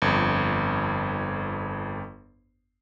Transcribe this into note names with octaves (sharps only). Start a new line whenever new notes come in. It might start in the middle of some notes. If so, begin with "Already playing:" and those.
G1 F2